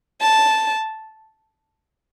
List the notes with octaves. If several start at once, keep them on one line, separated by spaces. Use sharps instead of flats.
A5